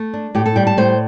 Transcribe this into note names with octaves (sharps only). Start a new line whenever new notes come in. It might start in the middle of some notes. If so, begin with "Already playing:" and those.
Already playing: A3
D4
A2 G4
A4
G3 G5
A5
A2 C5